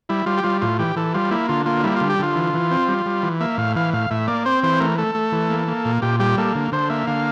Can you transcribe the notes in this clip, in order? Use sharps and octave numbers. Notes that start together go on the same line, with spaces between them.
G3 E4
G3 F4
G4
G3 F4
A2 F4
E3 G4
E3 A4
G3 F4
A#3 E4
D3 F4
A#3 F4
G3 E4
D3 F4
G4
D3 F4
E3
E3
C4
G3
G3
E3
A#3 E5
A2 F5
E3 F5
A2 F5
A2 E5
A#3 D5
C4 C5
E3 C5
A3 A#4
A3 A4
A3
E3
A#3
A#3
A#2
A#2 G4
G3 G4
A#3 A4
D3
D3 C5
A#3 E5
D3 F5